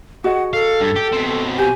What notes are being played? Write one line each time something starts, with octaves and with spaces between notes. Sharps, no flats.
F#4 G#4 D#5 F#5
A4 F5
G2
G4
B2 C4
G4 G#5